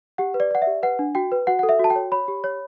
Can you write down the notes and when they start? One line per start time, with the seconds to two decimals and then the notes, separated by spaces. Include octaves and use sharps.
0.18 G4 F#5
0.34 B4
0.40 D5
0.51 D5 F#5
0.62 E5
0.67 G4
0.83 B4 F#5
0.99 D4
1.15 F#4 G5
1.32 B4
1.47 F#4 F#5
1.59 A4 F#5
1.69 E5
1.79 F#4
1.84 A5
1.90 G5
1.96 C#5
2.12 C#5 B5
2.28 G4
2.44 C#5